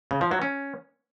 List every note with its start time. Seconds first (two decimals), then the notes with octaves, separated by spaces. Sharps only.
0.11 C#3
0.21 F3
0.31 F#3
0.42 C#4